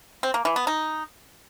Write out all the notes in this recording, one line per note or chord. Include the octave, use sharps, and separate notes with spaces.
C4
A#3
E3
B3
D#4